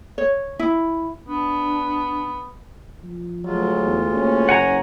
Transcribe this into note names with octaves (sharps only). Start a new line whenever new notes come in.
C#5
E4
B3 D4
F3
D2 F#3 G#3 F4
E2
A#3 C#4
F#1 F#5 G#5 A#5